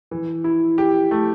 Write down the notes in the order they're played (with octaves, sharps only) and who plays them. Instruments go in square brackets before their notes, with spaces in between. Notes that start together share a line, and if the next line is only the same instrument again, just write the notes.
[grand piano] E3
E4
G4
A3